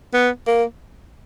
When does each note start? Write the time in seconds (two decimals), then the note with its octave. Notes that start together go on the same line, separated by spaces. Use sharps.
0.14 B3
0.47 A#3